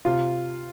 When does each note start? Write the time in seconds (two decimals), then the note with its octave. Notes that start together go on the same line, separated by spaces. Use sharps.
0.05 C3 F4